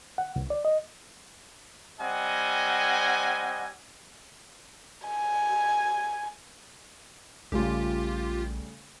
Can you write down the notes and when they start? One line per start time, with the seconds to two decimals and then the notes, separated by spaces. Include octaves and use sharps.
0.18 F#5
0.36 C2
0.50 D5
0.65 D#5
2.00 G3 C4 D#5 F#5 G#5
5.08 G#5
7.52 A#1 C#3 G3 A3 F4 G4